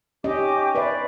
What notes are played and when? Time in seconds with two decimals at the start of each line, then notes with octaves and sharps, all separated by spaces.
0.24 C#4 G4 D#5 D6
0.75 B4 C5 D5 E5